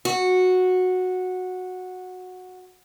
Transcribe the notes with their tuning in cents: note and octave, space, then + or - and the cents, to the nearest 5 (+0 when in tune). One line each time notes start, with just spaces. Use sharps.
F#4 -10